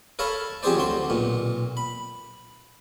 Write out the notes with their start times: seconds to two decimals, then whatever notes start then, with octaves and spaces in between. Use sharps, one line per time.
0.19 A4 A#4 C#5 F5 A5 B5
0.63 F3 C4 G4 G#4 C5 D5
0.75 D2 F#3 C4 C6
1.10 B1 A#2
1.77 B5